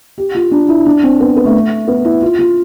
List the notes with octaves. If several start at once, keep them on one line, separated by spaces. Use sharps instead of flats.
G4
F4
D4
E4
D4
C4
B3
B3
A3
B3
E4
F4
F4